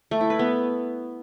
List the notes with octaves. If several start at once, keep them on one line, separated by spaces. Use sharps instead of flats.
A3
E4
B4
B3